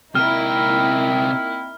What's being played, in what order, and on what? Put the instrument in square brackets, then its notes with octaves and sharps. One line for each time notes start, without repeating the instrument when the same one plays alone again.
[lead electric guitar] C3 A#4 [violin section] A#3 D#4 E4 [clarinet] C4 [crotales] F6